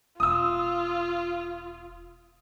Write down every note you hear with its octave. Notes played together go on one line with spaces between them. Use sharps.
E1 F4 D#6 E6